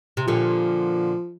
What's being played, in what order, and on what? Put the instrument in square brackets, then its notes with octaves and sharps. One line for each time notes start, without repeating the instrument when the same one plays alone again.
[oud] C3
[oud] A#2 D3 [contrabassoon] F3